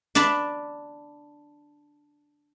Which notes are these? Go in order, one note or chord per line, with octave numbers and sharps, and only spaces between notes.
D4 D5 A5 B5